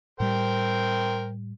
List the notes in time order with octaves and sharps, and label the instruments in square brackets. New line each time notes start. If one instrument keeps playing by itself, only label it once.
[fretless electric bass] A2 G3 [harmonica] A#4 C5 G5